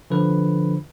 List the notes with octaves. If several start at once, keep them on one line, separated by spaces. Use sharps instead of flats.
D3 F3 B4